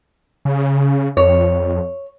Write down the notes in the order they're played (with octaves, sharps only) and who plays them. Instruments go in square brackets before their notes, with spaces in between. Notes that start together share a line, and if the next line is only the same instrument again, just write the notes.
[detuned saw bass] C#3
[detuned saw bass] F2 [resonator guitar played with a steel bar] C#5